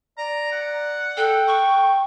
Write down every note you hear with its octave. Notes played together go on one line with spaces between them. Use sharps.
D5 A#5
F#5
A4 G5
C#6